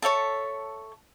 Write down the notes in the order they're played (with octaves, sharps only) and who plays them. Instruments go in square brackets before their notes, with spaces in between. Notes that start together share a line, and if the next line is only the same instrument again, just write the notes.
[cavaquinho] A4 C#5 E5 A5